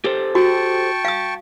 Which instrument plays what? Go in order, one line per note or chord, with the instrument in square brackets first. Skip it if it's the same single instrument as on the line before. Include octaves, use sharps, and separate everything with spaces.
[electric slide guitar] G4 A4 C5
[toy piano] F#4 [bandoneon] G5 A5 C#6
[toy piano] F5 D#6